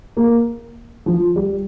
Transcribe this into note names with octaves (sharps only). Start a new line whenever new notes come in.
A#3
F3
G3